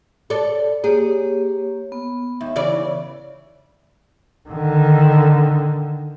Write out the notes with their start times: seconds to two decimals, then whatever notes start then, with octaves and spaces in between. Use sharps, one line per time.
0.30 A4 D5
0.84 A#3 G4 G#4 C#5
1.92 B3
2.41 D#2 E5
2.56 C#3 E3 D5
4.49 D3 D#3